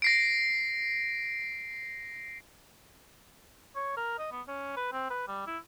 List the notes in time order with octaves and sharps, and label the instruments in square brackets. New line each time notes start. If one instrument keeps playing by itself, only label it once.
[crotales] A#6 C7 D7
[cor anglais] C#5
A#4
D#5
B3
C#4
B4
C4
B4
G3
E4